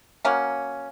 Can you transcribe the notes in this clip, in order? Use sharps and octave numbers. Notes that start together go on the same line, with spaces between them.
F#3 A#3 C#4